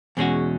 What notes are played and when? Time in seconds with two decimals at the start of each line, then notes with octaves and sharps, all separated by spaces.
0.17 E2 B2 G#3 C#4 F#4